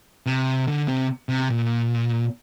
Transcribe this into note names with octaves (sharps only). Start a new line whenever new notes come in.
C3
D3
C3
C3
A#2